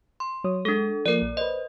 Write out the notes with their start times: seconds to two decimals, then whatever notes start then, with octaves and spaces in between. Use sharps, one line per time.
0.20 C6
0.44 F#3 C#5 D#6
0.65 G#3 D4 A4
1.06 F3 A#3 A#4 D5
1.22 A#1
1.37 B4 C5 D#5